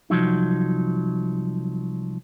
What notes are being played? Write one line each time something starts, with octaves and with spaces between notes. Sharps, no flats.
C2 F3 F#3 D#4